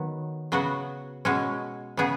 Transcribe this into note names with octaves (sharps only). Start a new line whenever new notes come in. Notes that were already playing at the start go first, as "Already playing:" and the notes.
Already playing: D#3 F#3 B3
C#3 F#3 B3 F#4
B2 G#3 C#4
C#3 B3 G#4